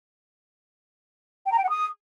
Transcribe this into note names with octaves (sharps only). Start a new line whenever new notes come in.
G5
A#5
G5
F#5
D#6